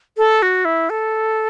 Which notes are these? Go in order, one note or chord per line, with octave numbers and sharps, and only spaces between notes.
A4
F#4
E4
A4